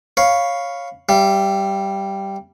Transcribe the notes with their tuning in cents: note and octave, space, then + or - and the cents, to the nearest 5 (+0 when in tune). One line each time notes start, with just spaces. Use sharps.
C#5 +0 F5 +0 B5 +0
G3 -5 E5 +40